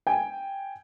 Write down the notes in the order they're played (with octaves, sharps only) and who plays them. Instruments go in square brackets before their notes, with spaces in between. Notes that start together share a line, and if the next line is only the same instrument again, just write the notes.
[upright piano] G5 G#5